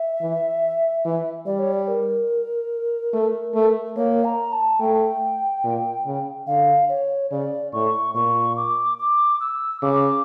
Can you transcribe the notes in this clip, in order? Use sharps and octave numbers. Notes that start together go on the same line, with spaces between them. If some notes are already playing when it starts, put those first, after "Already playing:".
Already playing: E5
E3
E3
G3 D5
C#5
D5
A#4
A3
A3
A#3 C#5
A#5
A5
A3 G5
A#2
C#3
D3 F5
C#5
C#3 D5
A2 C#6
A#2 C#6
D6
D6
E6
C#3 D6